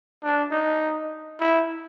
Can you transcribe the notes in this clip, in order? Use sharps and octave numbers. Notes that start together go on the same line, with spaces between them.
D4
D#4
E4